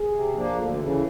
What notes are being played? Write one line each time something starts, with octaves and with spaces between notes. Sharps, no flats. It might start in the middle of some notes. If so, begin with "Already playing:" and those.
Already playing: G#4
C3
F3 A#3 D4
D2 A4
C#3 E3